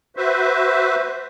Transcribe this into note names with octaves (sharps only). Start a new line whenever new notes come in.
F#4 B4 C5 E5